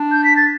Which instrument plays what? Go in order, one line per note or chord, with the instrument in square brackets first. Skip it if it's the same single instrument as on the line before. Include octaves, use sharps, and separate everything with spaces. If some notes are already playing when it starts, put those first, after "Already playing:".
Already playing: [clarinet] D4
[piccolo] G6
B6
A6